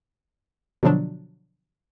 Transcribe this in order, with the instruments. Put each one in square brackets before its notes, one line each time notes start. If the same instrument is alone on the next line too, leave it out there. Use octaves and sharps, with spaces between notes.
[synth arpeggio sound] B2 D3 F3 F#3 D4